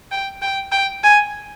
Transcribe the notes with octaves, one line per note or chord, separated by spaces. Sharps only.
G5
G5
G5
G#5